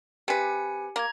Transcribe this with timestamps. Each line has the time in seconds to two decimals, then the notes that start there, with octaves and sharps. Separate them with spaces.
0.28 C3 G4 B4 G#5 C#7
0.96 A#3 A#5 G#6